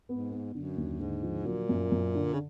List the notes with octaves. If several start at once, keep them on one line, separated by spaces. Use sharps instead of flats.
G#2 B3
B3
F#2 D3
D#2
G#2 D3
F3
A#2 F#3
F#2
F#2
D3
C#3